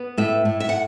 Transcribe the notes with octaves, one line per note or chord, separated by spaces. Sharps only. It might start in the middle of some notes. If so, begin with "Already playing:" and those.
Already playing: B3
A2 E5
A2
E5
F#5